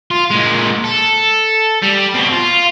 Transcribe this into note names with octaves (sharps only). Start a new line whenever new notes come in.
F4
A#2 G#3
A4
G3
B2 C4
F4